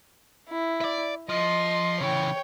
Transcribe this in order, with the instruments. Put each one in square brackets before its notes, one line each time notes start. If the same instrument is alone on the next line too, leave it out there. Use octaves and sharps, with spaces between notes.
[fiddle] E4
[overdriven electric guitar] D5 E5
[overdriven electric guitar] F3 [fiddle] D#5 C6
[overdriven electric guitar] C#3 E3 [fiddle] C#5 G5